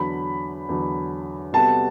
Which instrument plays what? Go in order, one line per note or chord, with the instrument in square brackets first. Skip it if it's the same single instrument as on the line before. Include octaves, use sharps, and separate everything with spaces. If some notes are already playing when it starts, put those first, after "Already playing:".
Already playing: [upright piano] E2 D3 F#3 [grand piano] B5
[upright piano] E2 D3 F#3
[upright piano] C3 G3 B3 F#4 A4 [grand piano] A5